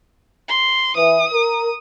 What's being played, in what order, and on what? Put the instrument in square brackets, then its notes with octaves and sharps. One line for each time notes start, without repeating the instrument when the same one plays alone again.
[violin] C6
[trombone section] E3 [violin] D#6
[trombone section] A#4